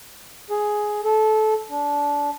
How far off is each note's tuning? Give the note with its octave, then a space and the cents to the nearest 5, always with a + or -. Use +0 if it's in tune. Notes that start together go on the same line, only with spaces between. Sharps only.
G#4 +10
A4 -20
D4 -20